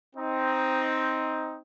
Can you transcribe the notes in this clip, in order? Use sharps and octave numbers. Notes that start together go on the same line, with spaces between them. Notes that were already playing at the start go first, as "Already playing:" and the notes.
C4 D#4